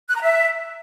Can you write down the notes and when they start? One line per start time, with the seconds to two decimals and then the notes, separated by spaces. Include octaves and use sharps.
0.09 F#6
0.15 A#5
0.22 E5